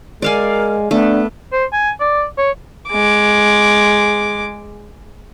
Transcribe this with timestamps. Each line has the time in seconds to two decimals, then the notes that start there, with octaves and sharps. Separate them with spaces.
0.22 G#3 A#4 D5 F5 G#5
0.91 A3 B3 D4
1.52 C5
1.73 G#5
2.01 D5
2.38 C#5
2.90 G#3 D6